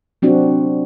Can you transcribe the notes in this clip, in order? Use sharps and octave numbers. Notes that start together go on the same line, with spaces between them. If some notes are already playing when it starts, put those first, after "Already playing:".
F#3 C4 D4 F#4